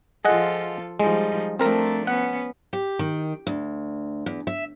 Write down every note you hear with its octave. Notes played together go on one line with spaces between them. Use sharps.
F3 F4 G#4 A4 D#5 F#5
F3 G3 G#3 D#4
F3 A3 C4 D4 A#4 A#5
B3 C#4 F#5
G4
D#3
D2
E2
E5